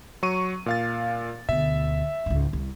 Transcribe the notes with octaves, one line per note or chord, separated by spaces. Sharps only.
F#3 C#6 D#7
A#2 F5 A6
D2 B2 E5
C#2 G#2
C2